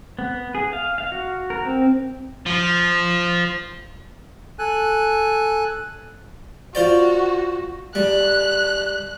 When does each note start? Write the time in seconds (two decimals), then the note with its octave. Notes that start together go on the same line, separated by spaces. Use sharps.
0.19 B3
0.55 G#4
0.73 F5
0.98 F5
1.12 F#4
1.50 A#4
1.65 C4
2.46 F3 F4
4.59 A4 G#5 F#6
6.75 F4 F#4 C5 D5
7.95 G3 F#6